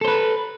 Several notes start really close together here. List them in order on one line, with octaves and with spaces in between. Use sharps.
A4 C5 B4